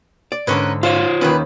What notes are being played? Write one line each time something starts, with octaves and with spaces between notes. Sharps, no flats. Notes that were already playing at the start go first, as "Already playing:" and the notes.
D5
G#2 D3 C#4 A#4 B4
F4 C5 C#5 F5
D#2 D#3 E3 C#4 B4